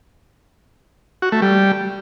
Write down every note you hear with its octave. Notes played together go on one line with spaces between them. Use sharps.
F#4
A3
G3